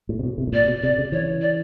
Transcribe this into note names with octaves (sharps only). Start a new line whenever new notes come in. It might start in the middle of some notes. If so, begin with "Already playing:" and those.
A2
C3
B2
C3
A2
A#2 D5
B2
C3 D5
C#3
E3 C#5
D5